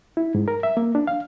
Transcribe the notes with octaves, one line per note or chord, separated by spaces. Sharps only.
E4
G#2
A#4
E5
A#3
D4
F5